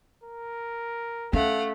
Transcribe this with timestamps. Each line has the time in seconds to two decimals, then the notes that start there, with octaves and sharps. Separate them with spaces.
0.24 A#4
1.33 A3 C#4 F5 F#5